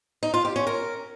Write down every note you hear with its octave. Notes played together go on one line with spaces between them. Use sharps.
D#4
F4
G4
C#4
A#4